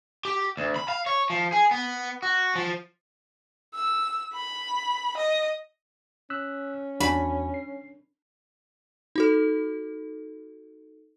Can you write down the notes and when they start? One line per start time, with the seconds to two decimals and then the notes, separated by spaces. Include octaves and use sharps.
0.25 G4
0.57 D2
0.76 B5
0.88 F5
1.06 C#5
1.30 F3
1.52 G#4
1.71 B3
2.23 F#4
2.55 F3
3.74 E6
4.33 B5
5.17 D#5
6.30 C#4 E6 F#6 B6
7.00 E2 D4 F#4 G#5 B5
7.54 C7
9.16 D#4 F#4 A4